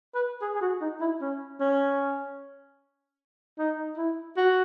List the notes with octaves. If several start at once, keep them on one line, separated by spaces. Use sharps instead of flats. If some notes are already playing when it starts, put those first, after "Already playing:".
B4
G#4
G#4
F#4
D#4
E4
C#4
C#4
D#4
E4
F#4